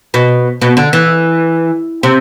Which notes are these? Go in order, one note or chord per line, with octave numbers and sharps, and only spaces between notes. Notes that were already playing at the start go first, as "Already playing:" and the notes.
B2
B2
D3
E3
C3